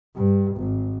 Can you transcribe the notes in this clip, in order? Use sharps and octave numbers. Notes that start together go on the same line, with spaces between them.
G2
G#1